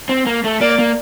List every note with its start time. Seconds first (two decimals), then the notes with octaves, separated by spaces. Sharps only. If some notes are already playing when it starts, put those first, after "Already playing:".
0.09 C4
0.26 A#3
0.44 A3
0.61 A#3 D5
0.79 A#3